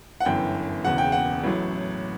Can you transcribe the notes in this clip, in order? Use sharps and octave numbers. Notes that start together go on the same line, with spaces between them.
F#5
G1 F#2 E3 G5
E1 E2 C#3 F#5
G5
F#5
A1 A2 F#3